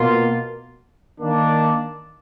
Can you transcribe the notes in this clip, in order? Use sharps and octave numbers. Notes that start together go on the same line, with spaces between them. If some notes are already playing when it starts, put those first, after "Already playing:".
Already playing: B2 A#3 F4
D#3 A#3 D4